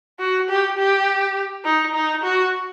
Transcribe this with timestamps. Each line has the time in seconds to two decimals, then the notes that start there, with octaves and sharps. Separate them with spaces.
0.20 F#4
0.49 G4
0.78 G4
1.64 D#4
1.94 D#4
2.23 F#4